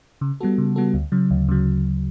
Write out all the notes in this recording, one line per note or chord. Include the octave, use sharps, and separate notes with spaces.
C#3
G3 B3 F#4 A4
C#3
G3 B3 F#4 A4
D2
C#3 F#3
D2
C#3 F#3